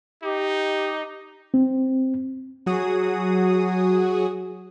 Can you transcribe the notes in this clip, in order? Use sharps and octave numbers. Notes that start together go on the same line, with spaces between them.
D#4 G4
C4
F#3 F#4 G#4 D#6